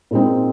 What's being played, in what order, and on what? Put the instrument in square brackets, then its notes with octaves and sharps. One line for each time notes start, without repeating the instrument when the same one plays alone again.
[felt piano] A#2 G#3 C4 D#4